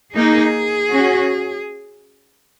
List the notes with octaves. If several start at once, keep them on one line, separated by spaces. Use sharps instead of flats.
A#3 D#4 G#4
C#4 F#4